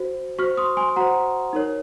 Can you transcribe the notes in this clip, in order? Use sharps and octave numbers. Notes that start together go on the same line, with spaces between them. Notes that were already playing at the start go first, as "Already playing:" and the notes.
Already playing: F#4 C5
F#4 C5 C#6 F6
C6 D#6
G#5 C6
F#4 C5 F#5 A#5
D#4 A#4 C#5